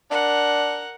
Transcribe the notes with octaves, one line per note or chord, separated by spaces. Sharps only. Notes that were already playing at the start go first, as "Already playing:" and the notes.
D4 A#4 F#5